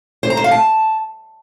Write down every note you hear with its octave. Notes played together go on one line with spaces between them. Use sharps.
C5
A#5
C5
F5
A5